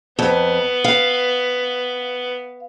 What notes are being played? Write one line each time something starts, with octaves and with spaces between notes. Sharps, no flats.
F2 B3
F5